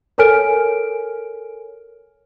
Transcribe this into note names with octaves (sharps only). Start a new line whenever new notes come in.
A4 A#4 C#5 G#5 F6 D7